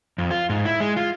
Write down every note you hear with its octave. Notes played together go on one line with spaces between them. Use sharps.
F2
F4
G#2
E4
G#3
F4